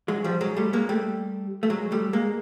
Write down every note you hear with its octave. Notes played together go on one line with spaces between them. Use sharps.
F#3 G#3
F3 G3
F#3 G#3
G3 A3
G#3 A#3
G3 A3
A3
F#3 G#3
G3 A3
G#3 A#3